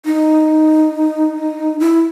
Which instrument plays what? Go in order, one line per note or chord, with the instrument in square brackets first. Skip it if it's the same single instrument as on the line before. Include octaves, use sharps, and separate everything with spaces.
[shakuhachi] D#4
E4